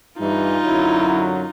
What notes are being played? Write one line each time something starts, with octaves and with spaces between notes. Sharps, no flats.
G2 E3 D#4 F4
F#2 D3 F#3 E4